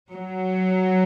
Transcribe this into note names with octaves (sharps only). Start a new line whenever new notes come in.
F#3